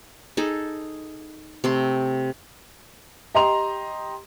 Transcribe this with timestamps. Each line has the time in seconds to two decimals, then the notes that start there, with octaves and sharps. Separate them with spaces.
0.37 D#4 G#4 A4
1.64 C3 A3 C6
3.34 G4 D#5 A#5 C6 F7